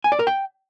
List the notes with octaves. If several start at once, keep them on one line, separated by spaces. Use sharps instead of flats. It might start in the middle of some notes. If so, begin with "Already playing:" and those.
G#5
D5
A#4
G5